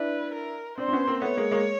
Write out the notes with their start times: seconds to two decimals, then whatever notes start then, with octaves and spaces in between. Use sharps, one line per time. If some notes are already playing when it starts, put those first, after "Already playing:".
Already playing: D4 E4 B4
0.34 A#4
0.78 C4 D4 C5
0.88 C4
0.93 B3 C#4
1.07 A#3 C4
1.22 A3 B3 C#5
1.37 G#3 A#3
1.51 G#3 A#3